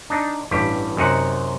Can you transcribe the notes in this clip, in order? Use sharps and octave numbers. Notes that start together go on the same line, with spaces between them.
D4 D#4
A1 G2 G4
F#2 C3 D#4 F#5